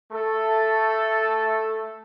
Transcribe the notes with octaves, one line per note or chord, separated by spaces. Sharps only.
A3 A4